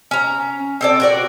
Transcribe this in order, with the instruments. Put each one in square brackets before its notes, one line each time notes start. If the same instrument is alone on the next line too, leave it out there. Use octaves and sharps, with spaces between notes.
[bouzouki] C#4 A#5
C4 A4 D5
F#4 A#4 D5